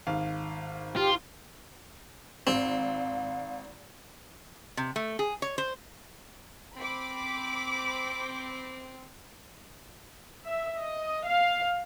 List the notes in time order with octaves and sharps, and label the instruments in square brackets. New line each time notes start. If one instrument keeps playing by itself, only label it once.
[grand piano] G#1 F5
[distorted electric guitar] F4 [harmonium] G4
[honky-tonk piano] G#1 [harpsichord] C4 [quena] F5
[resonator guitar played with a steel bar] C3
A3
G#4
C#5
C5
[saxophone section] C4 [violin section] B5 D6
[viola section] E5
D#5
F5